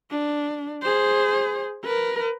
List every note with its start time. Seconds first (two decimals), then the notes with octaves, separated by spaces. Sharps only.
0.11 D4
0.83 G#4 C5
1.84 A#4 B4